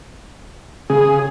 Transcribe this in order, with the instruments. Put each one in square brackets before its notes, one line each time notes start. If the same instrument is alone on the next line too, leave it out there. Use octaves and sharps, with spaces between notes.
[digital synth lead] C#3 [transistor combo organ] G#4